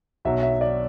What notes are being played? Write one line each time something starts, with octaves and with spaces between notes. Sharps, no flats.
B1 B2 F#3 E5
E5
D5